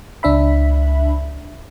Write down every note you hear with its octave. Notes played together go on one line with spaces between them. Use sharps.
C#2 D4 E5 B5